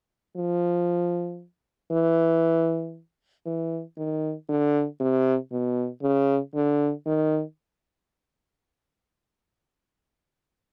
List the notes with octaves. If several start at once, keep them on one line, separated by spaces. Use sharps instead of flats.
F3
E3
E3
D#3
D3
C3
B2
C#3
D3
D#3